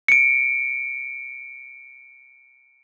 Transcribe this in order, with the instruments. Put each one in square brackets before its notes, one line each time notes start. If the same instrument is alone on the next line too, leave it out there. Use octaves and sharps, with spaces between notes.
[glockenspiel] C#7 D7